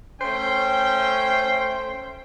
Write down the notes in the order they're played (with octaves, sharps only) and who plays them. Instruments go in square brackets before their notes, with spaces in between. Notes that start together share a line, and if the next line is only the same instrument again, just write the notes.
[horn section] A3 C#4 C5 G5